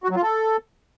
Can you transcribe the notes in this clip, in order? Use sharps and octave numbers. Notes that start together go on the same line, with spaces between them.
F#4
F#3
F4
A4